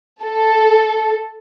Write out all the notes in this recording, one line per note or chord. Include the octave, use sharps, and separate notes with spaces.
A4